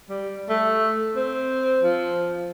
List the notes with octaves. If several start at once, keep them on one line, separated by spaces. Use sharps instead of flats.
G3
A3
C4
F3